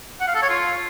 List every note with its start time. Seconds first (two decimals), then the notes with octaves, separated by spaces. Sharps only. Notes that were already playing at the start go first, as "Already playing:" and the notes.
0.20 F#5
0.28 F5
0.35 A4
0.42 C#5
0.50 F4